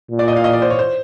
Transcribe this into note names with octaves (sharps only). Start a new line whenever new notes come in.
A#2
D5
D#5
F5
D#5
D5
C5
C#5
C5